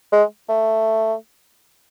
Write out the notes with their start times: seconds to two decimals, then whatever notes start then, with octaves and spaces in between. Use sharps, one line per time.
0.12 G#3
0.49 A3